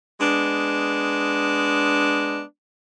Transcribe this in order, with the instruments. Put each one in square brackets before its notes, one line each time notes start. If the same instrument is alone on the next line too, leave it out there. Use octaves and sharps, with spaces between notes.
[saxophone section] G#3 B3 D4